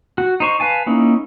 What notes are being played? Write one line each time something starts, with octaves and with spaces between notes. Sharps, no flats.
F#4
D#4 C5 C#6
B4 F5 G#5 A5
A#3 C#4 D#4 E4